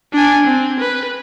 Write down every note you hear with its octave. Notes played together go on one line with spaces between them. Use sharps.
D4 G#5
C4
B4